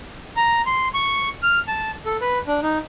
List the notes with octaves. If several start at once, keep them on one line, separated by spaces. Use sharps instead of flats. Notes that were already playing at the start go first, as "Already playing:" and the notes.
A#5
C6
C#6
F6
A5
A4
B4
D4
D#4